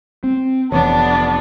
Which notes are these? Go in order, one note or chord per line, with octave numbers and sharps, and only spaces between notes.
C4
F1 E3 B3 D4 A5